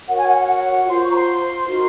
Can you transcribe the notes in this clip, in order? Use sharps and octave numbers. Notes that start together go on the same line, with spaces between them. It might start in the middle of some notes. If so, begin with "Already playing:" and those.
F#4 A#4 C#5 F#5
G#5
F#5
F#5
F#5
F4 C5 C6
C#6
A#5
C6
D#4 F#4 A#4